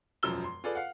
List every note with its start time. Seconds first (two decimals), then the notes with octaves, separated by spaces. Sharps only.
0.23 E1 F#2 F3 E6 G7
0.44 C6
0.64 F4 G#4 A4 B4 D5
0.75 F5 F#5